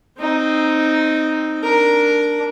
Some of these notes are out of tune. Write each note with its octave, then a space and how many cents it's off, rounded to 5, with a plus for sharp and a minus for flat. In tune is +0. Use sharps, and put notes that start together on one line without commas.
C4 +0 D#4 +0
D4 +0 A#4 +0